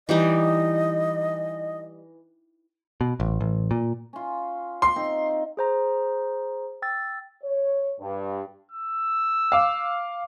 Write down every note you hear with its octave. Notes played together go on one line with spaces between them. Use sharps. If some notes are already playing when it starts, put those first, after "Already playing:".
E3 G3 D#4 D#5
B2
A1
A1
A#2
C#4 F4
C6
C4 D#4
G#4 C5 A#5
G5 E6 A6
C#5
G2
E6
F5 D6